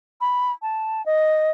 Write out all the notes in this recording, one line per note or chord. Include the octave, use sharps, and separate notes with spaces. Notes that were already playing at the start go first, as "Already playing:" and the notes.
B5
A5
D#5